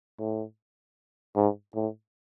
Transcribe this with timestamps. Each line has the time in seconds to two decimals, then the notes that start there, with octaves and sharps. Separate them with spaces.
0.20 A2
1.36 G#2
1.75 A2